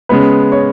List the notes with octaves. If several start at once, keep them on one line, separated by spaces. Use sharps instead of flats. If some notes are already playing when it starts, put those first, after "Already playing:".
C#3 G#3 B3 B4
C#5